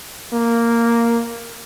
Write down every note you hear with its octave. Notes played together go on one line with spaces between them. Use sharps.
A#3